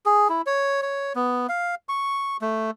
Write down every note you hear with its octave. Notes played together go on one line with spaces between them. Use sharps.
G#4
E4
C#5
C#5
B3
F5
C#6
A3